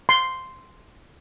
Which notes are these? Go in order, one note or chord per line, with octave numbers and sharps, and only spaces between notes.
C6